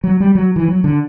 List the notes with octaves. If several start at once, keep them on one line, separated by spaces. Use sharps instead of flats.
F#3
G3
F#3
E3
F#3
D3